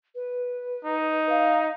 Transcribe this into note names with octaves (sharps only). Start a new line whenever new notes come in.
B4
D#4
F5